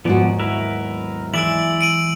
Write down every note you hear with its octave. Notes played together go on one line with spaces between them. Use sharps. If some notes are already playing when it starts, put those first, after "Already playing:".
D#2 G#2 F3 B3 F#4 D5
F#3 B3 E4 A#4 B4 E5
E3 G#3 E4 D5 E5 E6 D7 F#7
D7 D#7 F#7